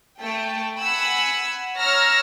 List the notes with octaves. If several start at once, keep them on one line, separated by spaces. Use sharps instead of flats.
A3 G5
F#5 G#5 B5 E6
C#5 A#5 E6 F6 A#6